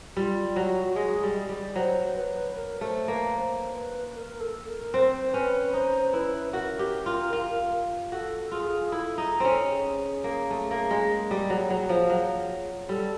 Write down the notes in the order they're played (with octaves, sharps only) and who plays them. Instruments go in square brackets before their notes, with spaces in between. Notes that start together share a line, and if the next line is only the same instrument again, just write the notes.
[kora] G3 [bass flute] F4
[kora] F#3 [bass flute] F#4
[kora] G#3 [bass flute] G#4
[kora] G3
G3
[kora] F#3 [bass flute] C5
[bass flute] B4
A#4
[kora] A3 [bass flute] C5
[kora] A#3 [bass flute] B4
[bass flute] C5
B4
A#4
A4
A#4
[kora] C4 [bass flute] C5
[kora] C#4 [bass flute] B4
[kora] D#4 [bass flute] C5
[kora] E4 [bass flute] B4
[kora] F#4 [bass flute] A#4
[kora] G4
F4
F4
[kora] F#4 [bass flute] A4
[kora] F4 [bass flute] G#4
[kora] E4 [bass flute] A4
[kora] D#4
C4 C#4
[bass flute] G4
G#4
[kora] A#3
A3
A#3
G#3
G3
F#3
F#3
F3
F#3
[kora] G3 [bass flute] A4